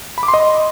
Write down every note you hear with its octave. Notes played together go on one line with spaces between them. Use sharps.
B5
D6
C6
D#5